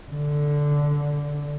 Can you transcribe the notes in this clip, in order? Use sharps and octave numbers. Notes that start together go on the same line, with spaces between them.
D3